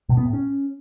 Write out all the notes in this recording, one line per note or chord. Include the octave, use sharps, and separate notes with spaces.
B2
B3
A2
C#4